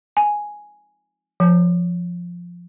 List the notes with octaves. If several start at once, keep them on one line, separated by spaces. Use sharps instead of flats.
G#5
F3